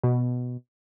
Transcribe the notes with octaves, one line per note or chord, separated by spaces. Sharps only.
B2